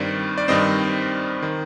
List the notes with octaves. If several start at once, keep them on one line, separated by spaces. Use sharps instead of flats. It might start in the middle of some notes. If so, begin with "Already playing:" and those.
Already playing: G2 D#3 G3 C4 D5
D5
G2 D#3 G3 C4 C5 D#5
D#3